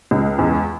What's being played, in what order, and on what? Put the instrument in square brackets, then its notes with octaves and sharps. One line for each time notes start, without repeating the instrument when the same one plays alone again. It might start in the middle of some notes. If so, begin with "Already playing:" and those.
[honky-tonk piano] C#2
E2